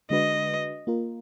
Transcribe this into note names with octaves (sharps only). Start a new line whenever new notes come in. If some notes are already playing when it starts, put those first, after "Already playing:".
D3 G#3 D4 F#4 B4 D#5
A#3 F4 A#4